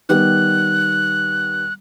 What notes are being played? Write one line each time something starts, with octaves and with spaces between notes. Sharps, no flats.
D#3 G3 B3 F#6